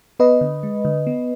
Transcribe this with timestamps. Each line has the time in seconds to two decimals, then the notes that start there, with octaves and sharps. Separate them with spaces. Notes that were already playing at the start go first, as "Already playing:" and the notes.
0.19 B3 B4 D#5
0.41 D3
0.63 G#3
0.85 D3
1.07 B3